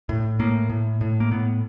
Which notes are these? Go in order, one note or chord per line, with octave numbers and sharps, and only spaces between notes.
A2
A2 A#3
A2
A2
A#3
A2 B3